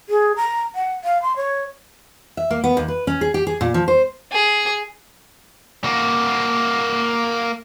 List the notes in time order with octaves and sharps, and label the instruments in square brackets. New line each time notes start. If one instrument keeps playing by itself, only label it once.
[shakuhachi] G#4
A#5
F#5
F5
C6
C#5
[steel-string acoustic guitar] E5
A#3
B3
D#2
B4
C#4
G#4
G4
G#4
A#2
F3
C5
[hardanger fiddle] G#4
[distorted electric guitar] A#3 F#4